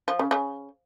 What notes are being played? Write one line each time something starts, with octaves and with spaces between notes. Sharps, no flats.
F3
C#3
C#3